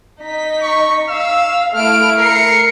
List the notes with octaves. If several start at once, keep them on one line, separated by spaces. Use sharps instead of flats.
D#4 B6
C#6
F5 E6
A3 E4 F6 D7
A#4 C7 C#7